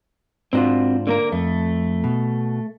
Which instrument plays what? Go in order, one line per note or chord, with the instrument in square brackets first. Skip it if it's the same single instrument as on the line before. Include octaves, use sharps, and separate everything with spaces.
[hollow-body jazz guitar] G#2 D4 F4 [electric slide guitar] C4 F#4
[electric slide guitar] D3 A#3 A#4
[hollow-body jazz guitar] F2 [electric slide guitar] A3
[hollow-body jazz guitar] B2